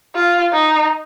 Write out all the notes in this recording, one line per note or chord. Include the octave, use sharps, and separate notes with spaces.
F4
D#4